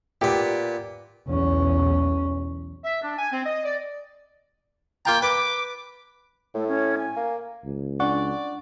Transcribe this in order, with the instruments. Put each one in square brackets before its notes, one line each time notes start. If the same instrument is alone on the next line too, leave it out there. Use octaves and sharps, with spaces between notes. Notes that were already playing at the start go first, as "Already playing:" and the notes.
[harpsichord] A#2 B3 [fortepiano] G4
[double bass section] B1 E2 [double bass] C#4
[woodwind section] E5
D4
G#5
C4
D#5
D5
[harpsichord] A#3 F4 A#5 [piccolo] G5
[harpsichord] B4 B5 [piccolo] D6
[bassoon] A2 [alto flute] A3
[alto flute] C#4
G#5
[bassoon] A#3
[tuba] C#2
[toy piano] D4 C#5 C#6 [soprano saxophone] D5 [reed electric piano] F#5